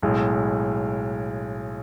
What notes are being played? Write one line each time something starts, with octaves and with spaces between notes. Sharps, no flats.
B1 A2 G#3